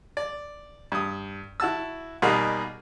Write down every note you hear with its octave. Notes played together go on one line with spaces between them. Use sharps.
D5
G2 D#6
E4 F#4 A5 E6
B2 G3 A#3 D#4 F#4 G#4